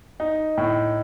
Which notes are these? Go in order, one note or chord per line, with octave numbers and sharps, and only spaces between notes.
D#4
A2